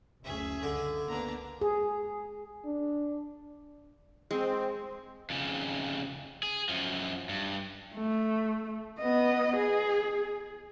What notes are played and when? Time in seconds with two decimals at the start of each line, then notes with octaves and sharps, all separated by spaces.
0.24 F#1 D2 C#4 G#4 E5
0.63 C#2 D3
1.08 A#3 B3 D4 A#5
1.61 G#4
2.65 D4
4.31 G#3 C4
5.30 F2 C#3
6.43 G#4
6.69 F#2 F3
7.29 G2
7.95 A3
8.99 B3 D#5
9.57 G#4